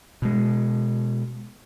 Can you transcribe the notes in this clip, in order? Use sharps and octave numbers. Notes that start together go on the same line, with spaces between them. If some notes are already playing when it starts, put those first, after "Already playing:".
B2 G#3